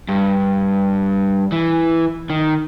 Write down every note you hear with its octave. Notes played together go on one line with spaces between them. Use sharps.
G2
E3
D#3